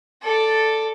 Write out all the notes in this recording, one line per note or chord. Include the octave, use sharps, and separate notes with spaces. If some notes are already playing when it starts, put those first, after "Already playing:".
A4 D5